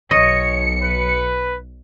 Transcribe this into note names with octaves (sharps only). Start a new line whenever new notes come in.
B1 C#5 D#5 C#7
B4